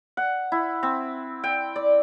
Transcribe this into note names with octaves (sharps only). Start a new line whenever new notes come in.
F#5
E4
C4
G5
D5